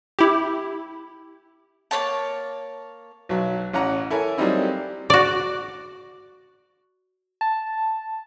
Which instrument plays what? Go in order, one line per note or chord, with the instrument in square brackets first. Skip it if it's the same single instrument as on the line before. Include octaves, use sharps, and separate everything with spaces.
[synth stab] E4 G4
[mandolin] A#3 C#4 C#5 A5
[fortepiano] B1 F#3
A1 C#4 F#5 A#5
E4 A4 A#4 C#5 G#5
F#3 G3 A#3 C4 D#4 E4
[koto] F#4 D5
[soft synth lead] A5